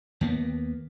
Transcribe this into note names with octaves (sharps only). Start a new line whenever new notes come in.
D#2 A#3 B3